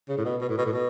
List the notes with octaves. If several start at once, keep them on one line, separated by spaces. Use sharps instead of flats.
C#3
A2
B2
B2
A2
B2
A2
B2